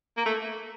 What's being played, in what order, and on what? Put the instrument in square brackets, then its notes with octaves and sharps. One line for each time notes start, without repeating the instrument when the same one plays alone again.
[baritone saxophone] A#3
A3